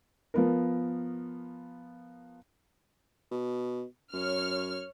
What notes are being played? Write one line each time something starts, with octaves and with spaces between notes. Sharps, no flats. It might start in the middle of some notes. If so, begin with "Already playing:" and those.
F3 B3 A#4
B2
F#2 C#5 F6